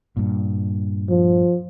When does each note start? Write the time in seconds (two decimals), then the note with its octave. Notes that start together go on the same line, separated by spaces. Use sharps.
0.17 G2 A#2
1.09 F3